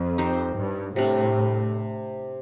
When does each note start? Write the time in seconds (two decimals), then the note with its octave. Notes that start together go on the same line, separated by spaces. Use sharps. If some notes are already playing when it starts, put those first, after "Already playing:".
Already playing: F2
0.18 C4 D#4 G4 C5
0.57 G2
0.96 A2 C3 G3 D4